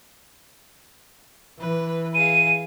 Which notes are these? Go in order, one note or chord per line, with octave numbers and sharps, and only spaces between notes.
E3 B4
G#4 F5 D#7